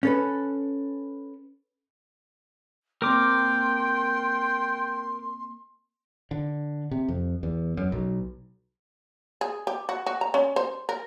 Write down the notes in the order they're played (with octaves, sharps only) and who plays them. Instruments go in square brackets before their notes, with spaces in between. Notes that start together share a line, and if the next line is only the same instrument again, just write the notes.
[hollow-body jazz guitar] C#4 A4 B4
[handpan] A#3 C4 [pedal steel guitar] A#4 D6 [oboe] G5 [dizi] C6
[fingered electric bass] D3
C3
F2
E2
F#2
B1
[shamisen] G#4
G4
F#4
F#4
A#5
C#4
C5
A#4